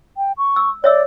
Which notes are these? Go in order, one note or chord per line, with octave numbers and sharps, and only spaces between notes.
G5
C#6
E6
C#5 D5 E5 E6